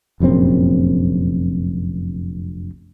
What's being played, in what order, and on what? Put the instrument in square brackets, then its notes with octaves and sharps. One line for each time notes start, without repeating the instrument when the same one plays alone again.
[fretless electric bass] F1 A#1 F#2 C4